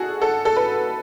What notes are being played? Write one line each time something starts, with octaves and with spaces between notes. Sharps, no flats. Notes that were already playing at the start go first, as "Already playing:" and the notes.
Already playing: F#4 G#4 A4
A4
A4
B4